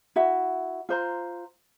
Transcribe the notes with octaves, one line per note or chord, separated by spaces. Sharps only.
E4 F#4 E5
F4 C5 A#5